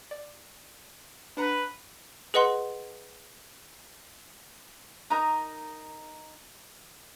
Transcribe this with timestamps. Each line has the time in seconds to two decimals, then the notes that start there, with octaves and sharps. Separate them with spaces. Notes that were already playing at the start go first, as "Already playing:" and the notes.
0.11 D5
1.37 D4 B4 F#5 A#5
2.34 G#4 B4 D#5 F#5 C6
5.10 D#4 A#4 A#5 D#6